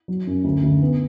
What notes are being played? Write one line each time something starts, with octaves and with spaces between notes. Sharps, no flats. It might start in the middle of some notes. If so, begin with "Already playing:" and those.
F#3
F#2
D2
D2
B3